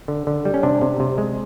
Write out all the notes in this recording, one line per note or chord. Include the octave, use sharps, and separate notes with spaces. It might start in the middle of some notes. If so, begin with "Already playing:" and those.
D3
D3
G3
C#4
C3 D4
C3
C3
G#3